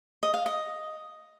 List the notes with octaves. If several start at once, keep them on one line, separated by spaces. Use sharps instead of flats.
D#5
F5
D#5